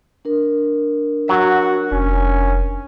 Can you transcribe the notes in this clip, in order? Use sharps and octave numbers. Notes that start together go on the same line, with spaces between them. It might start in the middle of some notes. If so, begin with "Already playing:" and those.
D4 A#4
F#3 F#4 E5
F1 C#4